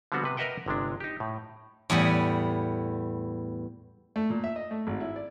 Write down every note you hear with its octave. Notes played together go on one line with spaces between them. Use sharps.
D3 F3 G3 B3 C4 F#4
C3 B4
A#4 B4 D#5 E5 F#5 G5
G1 C3 G#3 D4
D#4 G4
A2
E2 A2 G3 B3
A3
A#2
E5
D#5
A3
G#1
E4
D5